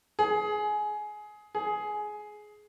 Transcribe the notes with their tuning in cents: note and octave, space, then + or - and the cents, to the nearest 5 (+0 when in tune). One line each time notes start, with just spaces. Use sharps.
G#4 +20
G#4 +15